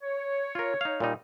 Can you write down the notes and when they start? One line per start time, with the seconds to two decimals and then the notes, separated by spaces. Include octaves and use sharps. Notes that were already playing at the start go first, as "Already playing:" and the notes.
0.03 C#5
0.55 F4 A#4
0.81 D#4 F5
1.00 A#2 G3 D#4